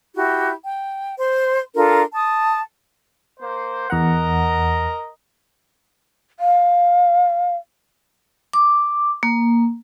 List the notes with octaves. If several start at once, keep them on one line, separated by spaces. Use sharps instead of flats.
E4 F#4 G4
G5
C5 C6
D4 F4 A4 A#4
A5 D#6
A#3 C5
E2 A#4 D#5 F#5 A#5
F5
D6
A#3